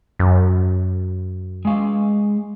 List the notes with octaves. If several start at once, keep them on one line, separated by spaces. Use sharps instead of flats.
F#2
G#3 F5